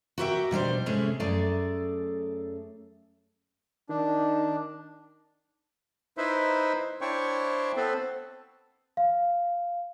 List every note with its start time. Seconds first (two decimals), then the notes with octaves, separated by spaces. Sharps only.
0.18 F#4 G4 A#4 C5 E5 G5
0.51 B2 G3 D4 C5
0.86 A2 C3 G#3 A3 C#4 G#4
1.20 F#2 A3 G#4 A4 D5
3.89 D#3 D4
6.17 D#4 E4 B4 C5 E5
7.01 D4 E4 C5 C#5 G5 C#6
7.77 B3 C4 A4 B4 C5
8.97 F5